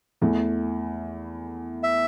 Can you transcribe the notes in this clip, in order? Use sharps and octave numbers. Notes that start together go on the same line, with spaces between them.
E2 E3 A3 E4
E5